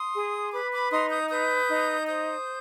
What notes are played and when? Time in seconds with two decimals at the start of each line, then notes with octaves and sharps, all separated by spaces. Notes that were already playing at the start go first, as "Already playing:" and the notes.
Already playing: C6 D#6
0.15 G#4
0.53 B4 B5 D6
0.72 B5 D6
0.91 D#4 C6 D#6
1.11 D#6 G6
1.30 B4 D#6 G6
1.69 D#4
2.07 C5 D#6 G6